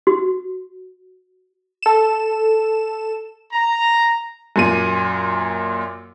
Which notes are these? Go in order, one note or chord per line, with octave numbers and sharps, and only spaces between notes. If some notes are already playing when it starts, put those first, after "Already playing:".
F#4
A4 E7
A#5
F#2 A#2 D#7